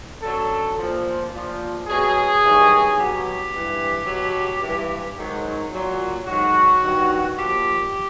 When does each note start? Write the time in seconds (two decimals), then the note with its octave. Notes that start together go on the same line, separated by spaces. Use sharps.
0.22 F#2 D3 F#3 A4
0.77 A#2 F3
1.32 A#2 F3
1.87 B2 F#3 G#4
2.42 G2 D#3 F#3
2.96 B2 F#3 G4
3.51 G2 E3
4.06 B2 F#3
4.61 G2 E3
5.16 G#2 D#3 F#3
5.71 A#2 F#3
6.26 G#2 D#3 F#3 F#4
6.81 G2 D#3 F#3
7.36 A#2 F3 G4